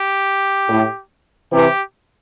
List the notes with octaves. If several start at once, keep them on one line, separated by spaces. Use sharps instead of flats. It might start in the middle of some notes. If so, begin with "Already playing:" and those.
Already playing: G4
A2
C3 E3 G4